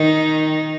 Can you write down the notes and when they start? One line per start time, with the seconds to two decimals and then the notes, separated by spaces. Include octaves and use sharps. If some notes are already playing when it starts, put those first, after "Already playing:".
Already playing: D#3 D#4